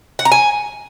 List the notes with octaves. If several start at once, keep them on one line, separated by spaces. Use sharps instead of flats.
F#5
A#5
G#5